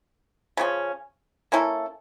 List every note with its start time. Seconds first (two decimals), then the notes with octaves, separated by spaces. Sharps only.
0.57 C#3 F3 C#4
1.52 A#3 C#4 E4 A4